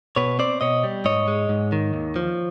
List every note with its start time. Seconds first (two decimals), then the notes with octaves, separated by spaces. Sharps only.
0.16 B2 B4 C#5
0.39 C4 C5 D5
0.61 B2 C#5 D#5
0.84 G3
1.05 G#2 C#5 D#5
1.28 G#3
1.49 G#2
1.72 D#3
1.94 D#2
2.16 F3